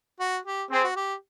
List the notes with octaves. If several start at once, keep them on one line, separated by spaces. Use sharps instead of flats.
F#4
G4
C4 G#4
F#4
G4